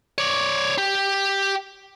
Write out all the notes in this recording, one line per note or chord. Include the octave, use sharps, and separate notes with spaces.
C#5 D5
G4